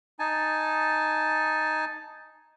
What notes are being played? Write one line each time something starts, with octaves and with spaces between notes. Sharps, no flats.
D#4 G#5 A5